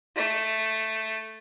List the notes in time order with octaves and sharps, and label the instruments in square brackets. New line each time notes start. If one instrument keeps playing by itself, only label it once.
[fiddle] A3